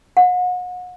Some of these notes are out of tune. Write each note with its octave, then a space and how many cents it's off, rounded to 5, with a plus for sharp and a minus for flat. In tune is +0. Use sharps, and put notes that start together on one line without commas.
F#5 -35